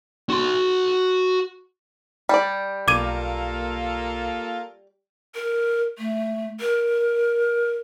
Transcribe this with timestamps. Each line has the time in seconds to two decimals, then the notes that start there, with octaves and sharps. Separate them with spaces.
0.30 F#4 C6
2.29 G3 D5
2.88 B1 A#3 F4 A4 D6 G#6 D#7
5.35 A#4
5.98 A3
6.60 A#4